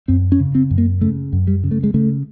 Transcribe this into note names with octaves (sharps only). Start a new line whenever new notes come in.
F#2 C4
C#4
C#3
C4
F#2
A#3
C#3 A3
F#2
G3
C#3
A3
G#3
C#3 A3